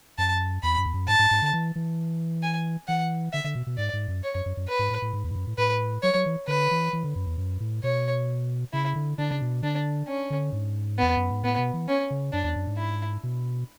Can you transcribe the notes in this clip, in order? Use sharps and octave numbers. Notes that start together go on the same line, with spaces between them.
F#2 A5
E2 B5
F#2
E2
F#2
G#2 A5
G#2
G#2
D3
E3
E3
G#5
E3 F#5
D3 E5
D3
B2
B2
G#2 D5
G#2
F#2
C#5
F#2
F#2
F#2
B4
G#2
A2
A2
G#2
E2
G#2
F#2
A2
A2 B4
F#3 C#5
F#3
E3
D3 B4
E3
E3
D3
F#2
E2
F#2
A2
B2 C#5
C#3 E4
D3
D3 D4
C#3
B2
D3 D4
C#4
D3
G#2
E2 B3
F#2
G#2
A2 B3
B2
E3
C#4
C#3
F#2 D4
E2
F#2
G#2
E4
B2